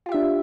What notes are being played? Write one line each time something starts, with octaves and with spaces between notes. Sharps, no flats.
D4 F4 G4 E5